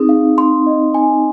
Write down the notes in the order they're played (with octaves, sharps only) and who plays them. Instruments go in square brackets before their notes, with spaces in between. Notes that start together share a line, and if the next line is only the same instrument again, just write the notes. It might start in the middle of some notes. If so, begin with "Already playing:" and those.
Already playing: [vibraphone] C4 D#4 [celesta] G#4
[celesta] F5
C6
D#5
G#5